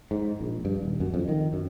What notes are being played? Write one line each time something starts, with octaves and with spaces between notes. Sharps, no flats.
G#2
A#1
G2
D#1
F#2
F2
D#3
F#2